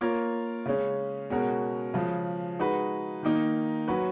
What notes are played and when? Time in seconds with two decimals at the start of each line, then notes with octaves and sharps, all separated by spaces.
0.01 A#3 F4 A#4 C#5
0.66 C#3 G#3 C#4
1.30 B2 G#3 C#4 F#4 A#4
1.94 C#3 F3 G#3
2.59 G#3 D#4 F#4 B4
3.23 D#3 A#3 D#4
3.88 F#3 C#4 F#4 B4